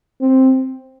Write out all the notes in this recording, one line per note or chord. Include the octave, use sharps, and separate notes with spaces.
C4